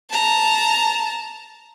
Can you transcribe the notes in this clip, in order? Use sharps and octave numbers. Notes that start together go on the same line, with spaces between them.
A5 A#5